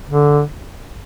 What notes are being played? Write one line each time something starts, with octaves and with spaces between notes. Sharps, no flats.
D3